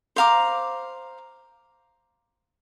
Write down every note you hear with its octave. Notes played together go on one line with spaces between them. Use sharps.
C5 F5 A#5 D6